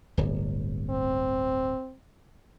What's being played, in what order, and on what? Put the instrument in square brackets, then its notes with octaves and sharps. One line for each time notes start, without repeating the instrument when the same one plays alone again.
[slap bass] D1 G1
[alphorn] C4